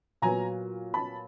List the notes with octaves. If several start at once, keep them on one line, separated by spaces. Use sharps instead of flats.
A#2 F#3 B3 G#5 A#5
A5 B5